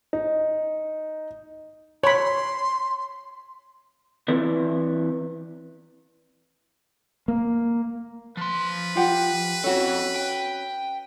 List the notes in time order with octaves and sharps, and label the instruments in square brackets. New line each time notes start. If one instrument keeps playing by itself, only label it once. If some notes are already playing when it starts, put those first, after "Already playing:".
[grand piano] D#4
[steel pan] C#5 B5 [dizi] C6
[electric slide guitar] E3 C4 E4 B4 D5
[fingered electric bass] A#3
[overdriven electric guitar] F3 C6 [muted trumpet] B4
[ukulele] F4 G4 F#5
[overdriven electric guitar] C4 A4 [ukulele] C#4 F#4
[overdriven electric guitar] G5